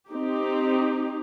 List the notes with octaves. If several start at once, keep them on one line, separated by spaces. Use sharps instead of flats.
C4 D#4 G4